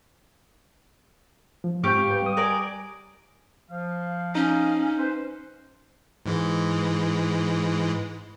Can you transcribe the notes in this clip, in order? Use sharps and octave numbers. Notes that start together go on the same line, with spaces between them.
F3
G#2 C4 G4 F5 G5 C#6
B4 G5
G3 D#6
A#4 D5 G#5
F3 F5
C#4 D#4
B4 C5
G#2 E3 G#3